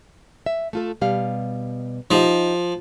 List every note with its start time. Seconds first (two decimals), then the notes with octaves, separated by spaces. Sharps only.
0.46 E5
0.73 A3 F4 A4
1.01 B2 G3 F5
2.11 F3 D#4 G4 D#5